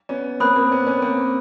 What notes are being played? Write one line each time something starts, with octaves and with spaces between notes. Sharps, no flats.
B3 C#4
A#3 C4 B5 D#6 F#6
A#3 C4
B3 C#4
B3 C#4
A#3 C4